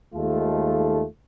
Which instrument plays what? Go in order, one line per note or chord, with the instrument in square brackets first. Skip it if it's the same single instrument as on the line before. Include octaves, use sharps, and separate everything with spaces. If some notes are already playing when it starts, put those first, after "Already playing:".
[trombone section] D#2 D#3 G#3 A3 F4 A4